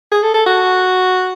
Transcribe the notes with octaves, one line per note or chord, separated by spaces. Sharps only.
G#4
A4
A4
F#4